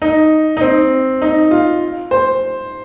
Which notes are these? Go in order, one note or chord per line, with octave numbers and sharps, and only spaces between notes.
D#4
D#4
C4
D#4
F4
C5